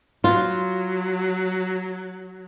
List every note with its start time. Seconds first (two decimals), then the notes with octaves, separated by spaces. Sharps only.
0.24 F#3 F4